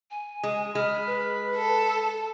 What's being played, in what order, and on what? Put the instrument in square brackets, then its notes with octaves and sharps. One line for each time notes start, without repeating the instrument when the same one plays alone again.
[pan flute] G#5
[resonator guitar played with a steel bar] G#3
[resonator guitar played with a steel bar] G#3 [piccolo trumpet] B5 [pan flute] F6
[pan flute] B4
[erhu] A4
[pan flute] A5